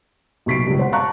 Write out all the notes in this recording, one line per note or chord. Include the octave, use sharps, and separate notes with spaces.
B1 C3 C#6 B6 C7 D7
C#2 G2
C5 F#5
F5 A5 A#5 C#6 F#6